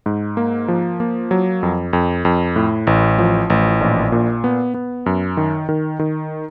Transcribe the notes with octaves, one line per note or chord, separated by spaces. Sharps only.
G#2
A#3
F3
A#3
F#3
F2
F2
F2
A2
A1
F3
A1
A#1
A#2
B3
B3
F#2
D#3
D#3
D#3